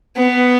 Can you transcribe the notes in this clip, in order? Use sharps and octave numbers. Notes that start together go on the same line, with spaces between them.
B3